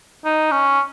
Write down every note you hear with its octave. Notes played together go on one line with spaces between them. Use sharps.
D#4
C#4